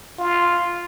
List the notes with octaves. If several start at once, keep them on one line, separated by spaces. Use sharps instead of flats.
F4